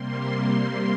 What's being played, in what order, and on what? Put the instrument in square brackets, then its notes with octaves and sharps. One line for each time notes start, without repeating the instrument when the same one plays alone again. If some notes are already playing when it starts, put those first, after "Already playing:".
Already playing: [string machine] C3 G3 A#3 C6